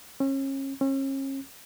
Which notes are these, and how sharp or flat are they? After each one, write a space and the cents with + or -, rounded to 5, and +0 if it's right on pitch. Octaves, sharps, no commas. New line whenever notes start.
C#4 -35
C#4 -40